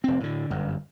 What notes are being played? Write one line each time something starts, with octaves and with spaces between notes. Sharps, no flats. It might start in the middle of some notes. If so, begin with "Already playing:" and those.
F1 C4
A2 D3
G1 F#2